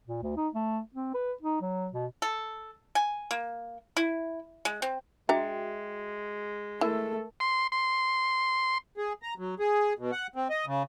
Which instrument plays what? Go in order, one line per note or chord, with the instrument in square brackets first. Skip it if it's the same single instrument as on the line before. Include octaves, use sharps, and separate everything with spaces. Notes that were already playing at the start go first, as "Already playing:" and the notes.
[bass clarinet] A#2
D2
D#4
A3
C4
B4
D#4
F#3
B2
[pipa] A4
G#5
A#3
E4
G#3
C4
[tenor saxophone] G#3 [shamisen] D4 A#5 [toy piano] F#4 E5 G5
[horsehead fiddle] A3 A4 [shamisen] E4 [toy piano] A#4
[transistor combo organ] C6
C6
[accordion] G#4
A#5
F#3
G#4
B2
F#5
C4
D#5
C#3